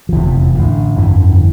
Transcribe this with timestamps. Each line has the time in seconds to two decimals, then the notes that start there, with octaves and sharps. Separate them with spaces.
0.09 F3
0.12 F1 E2 C3 E3
0.27 F3
0.41 F3
0.54 A1 A2 D3
0.96 G1 F2 D3 E3